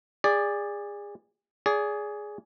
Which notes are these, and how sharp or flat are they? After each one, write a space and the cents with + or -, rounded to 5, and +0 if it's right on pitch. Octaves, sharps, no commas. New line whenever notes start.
G#4 -30 D5 +0
G#4 +0 D5 -30